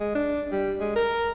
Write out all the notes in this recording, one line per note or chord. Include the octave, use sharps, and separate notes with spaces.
G#3
D4
G3
G#3
A#4